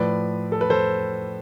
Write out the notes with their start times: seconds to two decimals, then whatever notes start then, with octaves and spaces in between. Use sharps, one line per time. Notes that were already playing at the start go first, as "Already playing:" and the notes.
Already playing: A2 F3 B4 D5
0.52 A4
0.61 B4
0.70 A4 C5